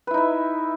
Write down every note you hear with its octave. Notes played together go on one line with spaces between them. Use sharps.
D#4 E4 B4 E5